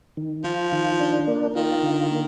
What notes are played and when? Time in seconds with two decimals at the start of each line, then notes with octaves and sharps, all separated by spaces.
0.17 D#3
0.44 F3 F4
0.72 D#3
1.00 D4
1.27 A#3
1.55 D#3 F4
1.83 D3
2.11 A#3